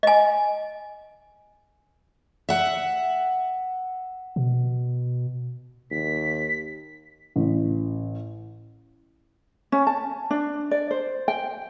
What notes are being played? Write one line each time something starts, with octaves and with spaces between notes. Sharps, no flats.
D#5 G#5
E5 F#5
B2
D#2 B6
A1
C#4
A5
D4
D5
C5
G5